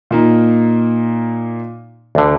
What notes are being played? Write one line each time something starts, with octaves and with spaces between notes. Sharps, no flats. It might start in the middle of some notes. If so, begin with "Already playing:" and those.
A#2 A#3 D#4
D2 D3